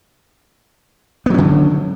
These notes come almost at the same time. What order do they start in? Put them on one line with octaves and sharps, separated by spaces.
B3 F#3 C#4 D3